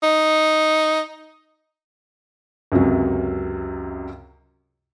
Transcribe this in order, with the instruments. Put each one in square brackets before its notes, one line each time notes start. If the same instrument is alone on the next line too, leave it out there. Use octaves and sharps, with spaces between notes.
[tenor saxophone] D#4
[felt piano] C#2 F#2 C3 F#3